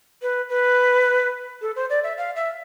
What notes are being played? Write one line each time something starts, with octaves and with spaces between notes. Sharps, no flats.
B4
B4
A4
C5
D5
E5
F5
E5